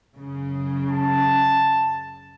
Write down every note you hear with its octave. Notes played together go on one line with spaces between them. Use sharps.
F#2 C#3
A5